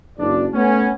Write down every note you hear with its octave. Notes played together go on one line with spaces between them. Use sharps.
F#1 D4 D5
A3 B3 C#4